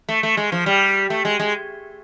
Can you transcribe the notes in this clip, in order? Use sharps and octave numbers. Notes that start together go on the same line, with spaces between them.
A3
A3
G#3
F3
G3
A3
G#3
G#3